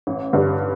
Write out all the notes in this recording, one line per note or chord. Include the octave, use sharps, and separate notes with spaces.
A1
G2 D3 G3